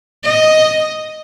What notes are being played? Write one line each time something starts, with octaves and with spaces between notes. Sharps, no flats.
D#5